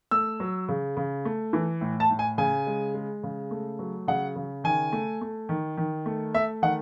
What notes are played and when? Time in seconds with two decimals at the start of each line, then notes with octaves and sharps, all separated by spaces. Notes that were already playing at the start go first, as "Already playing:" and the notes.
0.11 A3 E6
0.40 F#3
0.69 C#3
0.97 C#3
1.25 A3
1.53 E3
1.81 A2
2.00 A5
2.10 A2
2.19 G#5
2.38 C#3 G#5
2.67 G#3
2.94 G#3
3.23 C#3
3.51 A3
3.79 F#3
4.08 C#3 F#5
4.36 C#3
4.64 D#3 G#5
4.93 A3
5.21 A3
5.49 D#3
5.77 D#3
6.06 A3
6.34 A3 E5
6.62 D#3 F#5